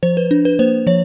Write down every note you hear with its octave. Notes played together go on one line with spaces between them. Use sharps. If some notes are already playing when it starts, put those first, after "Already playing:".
F3 C5
B4
D4
B4
A#3 C5
F3 C#5